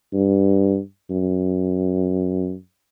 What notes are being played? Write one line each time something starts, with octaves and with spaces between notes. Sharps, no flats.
G2
F#2